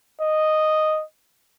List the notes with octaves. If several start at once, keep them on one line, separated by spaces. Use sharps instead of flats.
D#5